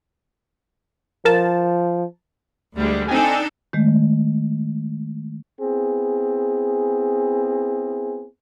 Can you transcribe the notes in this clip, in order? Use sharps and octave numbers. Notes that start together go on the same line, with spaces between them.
F3 A#4 A5
D2 G3 G#3
C4 D4 D#4 A4 G5 G#5
D#3 G#3 A3
B3 C4 E4 G#4